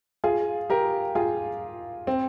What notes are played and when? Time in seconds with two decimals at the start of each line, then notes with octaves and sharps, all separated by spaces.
0.24 F4 G#4
0.70 G4 A#4
1.15 F4 G#4
2.07 C4